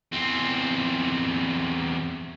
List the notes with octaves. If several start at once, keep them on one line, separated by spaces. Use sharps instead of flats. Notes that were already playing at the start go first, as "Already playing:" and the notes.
E2 C4